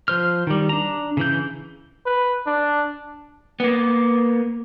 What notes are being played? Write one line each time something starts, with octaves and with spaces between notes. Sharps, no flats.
F3 C5 F6
D#3 G3
D4 A#5
C#3 E3 G6
B4
D4
A#3 B3